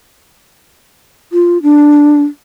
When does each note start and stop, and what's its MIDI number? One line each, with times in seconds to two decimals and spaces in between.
1.33 1.58 65
1.63 2.23 62